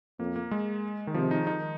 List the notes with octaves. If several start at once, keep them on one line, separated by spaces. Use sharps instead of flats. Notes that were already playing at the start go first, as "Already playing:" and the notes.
F2 A#3
A#3
G#3
D#3
C3 F3
D#4
D#3 D#4